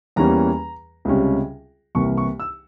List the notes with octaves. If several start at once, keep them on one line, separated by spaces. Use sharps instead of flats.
E2 E3 G3 A#3 C#4 A#5
C#2 C3 G3 C#4
C2 C3 E3 A#3 C#6
C#6
E6